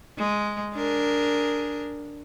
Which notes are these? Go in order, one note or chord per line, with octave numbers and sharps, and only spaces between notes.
G#3
D4 G#4 A#4